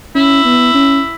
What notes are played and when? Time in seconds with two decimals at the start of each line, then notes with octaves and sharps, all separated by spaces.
0.15 C#4 E4
0.45 B3
0.74 C#4